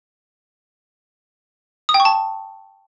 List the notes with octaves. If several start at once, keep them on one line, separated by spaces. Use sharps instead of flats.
D#6
G5
C#6
A5